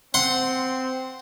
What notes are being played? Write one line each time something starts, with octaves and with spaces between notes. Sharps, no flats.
C4 F#5 C6